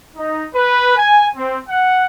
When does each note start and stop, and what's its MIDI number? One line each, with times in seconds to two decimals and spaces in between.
0.16 0.44 63
0.54 0.95 71
0.96 1.26 80
1.36 1.57 60
1.68 2.03 78